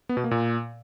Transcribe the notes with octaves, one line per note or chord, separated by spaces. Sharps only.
B3
B2
A#3
A#2